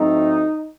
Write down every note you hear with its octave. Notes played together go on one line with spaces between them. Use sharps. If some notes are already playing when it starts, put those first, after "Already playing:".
Already playing: A2 F#3 A3 C4 D#4